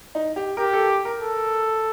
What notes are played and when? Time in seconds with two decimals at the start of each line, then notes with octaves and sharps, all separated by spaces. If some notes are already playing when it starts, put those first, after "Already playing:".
0.15 D#4
0.36 G4
0.57 G4 A#4
0.73 A4
1.05 A#4
1.21 A4